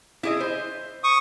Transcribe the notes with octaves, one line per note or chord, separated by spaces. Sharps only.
E4 G#4 D#5
C5
C#6 D#6